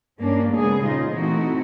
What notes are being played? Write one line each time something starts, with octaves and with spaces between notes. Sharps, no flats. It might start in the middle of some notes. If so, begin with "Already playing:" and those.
G2 A#3 C#4 D4
C#3 G#3 B3 G#4
A#2 C#3 D#4 F4 C5 D#5
E3 A3 C4 D#4 E4 F#4